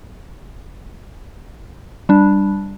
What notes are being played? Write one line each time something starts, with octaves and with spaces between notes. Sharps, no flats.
G3 D4